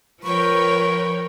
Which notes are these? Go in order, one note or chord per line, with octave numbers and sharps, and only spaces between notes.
F3 A#4 B4 C#5 G5 C#6